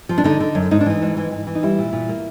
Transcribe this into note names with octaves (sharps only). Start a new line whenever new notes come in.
F3
D4
D3 D#4
D3
F#2
G#2 D#4
D4
E3 D#4
G#2
E3
E3
E3
D#4
G3 E4
A#2
A#2
A#3